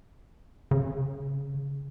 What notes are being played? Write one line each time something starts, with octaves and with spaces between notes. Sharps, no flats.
C#3